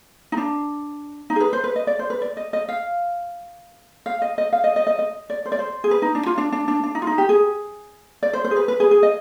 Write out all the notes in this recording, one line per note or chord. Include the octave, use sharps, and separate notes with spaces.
D#4
D4
D#4
G#4
B4
C5
B4
D#5
D5
C5
B4
D5
D#5
D#5
F5
F5
D#5
D#5
F5
D#5
D#5
D#5
D#5
D5
C5
D5
C5
G#4
B4
D#4
D4
F4
D4
D4
D4
D4
D#4
F4
D#4
G4
G#4
D5
C5
C5
G#4
B4
B4
G#4
G#4
D#5